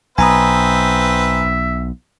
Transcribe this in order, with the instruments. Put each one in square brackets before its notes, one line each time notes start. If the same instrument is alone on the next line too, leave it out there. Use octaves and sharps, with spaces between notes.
[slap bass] B1 [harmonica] C4 B4 [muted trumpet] E5 [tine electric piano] G#5 A#5 D#6